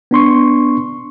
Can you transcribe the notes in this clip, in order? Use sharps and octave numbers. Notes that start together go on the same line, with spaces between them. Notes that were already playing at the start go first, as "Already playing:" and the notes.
B3 D4 C6 C#6